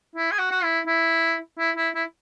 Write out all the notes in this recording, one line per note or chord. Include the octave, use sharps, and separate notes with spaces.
E4
G#4
F#4
F#4
E4
E4
E4
E4
E4